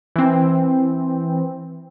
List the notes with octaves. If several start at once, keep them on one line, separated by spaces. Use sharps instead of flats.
E3 C4